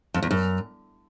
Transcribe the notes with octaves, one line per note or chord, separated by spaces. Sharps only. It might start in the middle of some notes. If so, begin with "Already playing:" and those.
F2
E2
F#2